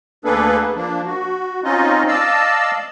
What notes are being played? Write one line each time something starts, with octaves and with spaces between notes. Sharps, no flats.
D2 A#3 D4 G#4 A4 B4
F3 A#3 D4
F#4
C4 C#4 D#4 F4 D#5
D5 D#5 F5 A5 E6